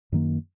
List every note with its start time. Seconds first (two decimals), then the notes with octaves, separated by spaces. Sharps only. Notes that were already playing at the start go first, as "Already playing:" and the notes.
0.12 F#2 D#3 A#3